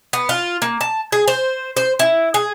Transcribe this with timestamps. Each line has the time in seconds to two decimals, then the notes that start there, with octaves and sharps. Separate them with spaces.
0.13 B3
0.29 F4
0.62 A#3
0.81 A5
1.12 G#4
1.28 C5
1.77 C5
1.99 E4
2.34 G#4